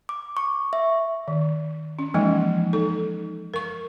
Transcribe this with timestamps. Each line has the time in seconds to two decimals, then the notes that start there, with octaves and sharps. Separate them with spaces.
0.09 D6
0.37 C#6
0.73 E5
1.28 D#3
1.99 C#4
2.14 E3 F3 G#3 A#3 C#4 D#4
2.73 D#4 A4
3.54 A#4 C#6